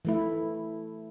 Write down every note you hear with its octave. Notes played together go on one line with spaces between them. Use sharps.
E3 A3 E4